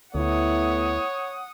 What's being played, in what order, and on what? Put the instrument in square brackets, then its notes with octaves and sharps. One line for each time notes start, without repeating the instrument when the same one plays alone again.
[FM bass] D2 [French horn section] A3 B3 E4 [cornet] C#5 [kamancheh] F#5 D#6